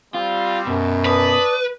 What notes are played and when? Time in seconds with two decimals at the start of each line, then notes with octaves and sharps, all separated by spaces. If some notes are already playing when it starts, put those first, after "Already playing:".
0.14 G3 C4 F4
0.67 F#2 B2
1.05 B4 D5 A5 D#6